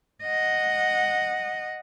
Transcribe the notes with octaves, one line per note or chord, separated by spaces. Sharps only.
D#5 F#5